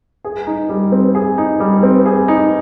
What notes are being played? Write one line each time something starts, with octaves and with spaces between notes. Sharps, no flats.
G#4
D#4
G3
C4
G#4
D#4
G3
C4
G#4
D#4